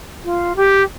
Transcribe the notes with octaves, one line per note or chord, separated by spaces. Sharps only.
F4
G4